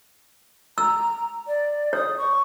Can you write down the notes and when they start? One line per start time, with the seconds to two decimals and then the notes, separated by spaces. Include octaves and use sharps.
0.78 A#5 E6
1.47 D5
1.93 C#5 D#6
2.18 C#6